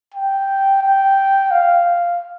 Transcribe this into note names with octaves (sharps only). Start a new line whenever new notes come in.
G5
G5
F5